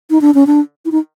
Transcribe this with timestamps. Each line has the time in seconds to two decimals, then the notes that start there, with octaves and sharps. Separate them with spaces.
0.10 D#4
0.21 D4
0.34 C#4
0.47 D4
0.85 E4
0.92 D#4